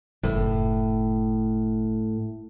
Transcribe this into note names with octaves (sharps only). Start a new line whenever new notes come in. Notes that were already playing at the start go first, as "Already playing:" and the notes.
F#1 A2